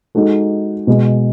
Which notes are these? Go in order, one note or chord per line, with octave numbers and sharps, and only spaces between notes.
G#3 D#4 F#4 A4
B2 G#3 B3